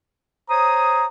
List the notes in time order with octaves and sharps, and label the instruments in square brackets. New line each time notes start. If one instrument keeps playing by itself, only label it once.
[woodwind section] C5 C#5 D#6 [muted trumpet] A#5